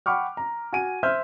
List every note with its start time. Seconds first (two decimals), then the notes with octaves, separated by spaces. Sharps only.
0.06 F#5 G5 B5 C#6 D6 F6
0.37 A#5
0.72 F#4 G#5 D#7
1.03 C5 E5 F6 G6